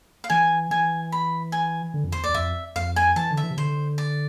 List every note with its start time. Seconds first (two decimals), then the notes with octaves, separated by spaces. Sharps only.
0.24 F5
0.30 E3 G#5
0.71 E3 G#5
1.12 B5
1.52 G#5
1.94 D3
2.04 F2
2.12 E2 C5
2.24 D5
2.29 E2
2.34 F2 E5
2.76 F2 F5
2.96 G#5
3.16 E3 A5
3.30 D3
3.37 E5
3.43 E3
3.50 C3
3.57 D3 C5
3.98 D5